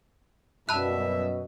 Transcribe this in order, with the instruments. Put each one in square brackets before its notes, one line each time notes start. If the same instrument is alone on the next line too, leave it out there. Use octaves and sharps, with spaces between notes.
[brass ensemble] F#2 B2 [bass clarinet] G3 [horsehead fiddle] E5 [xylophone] A5 B5 F#6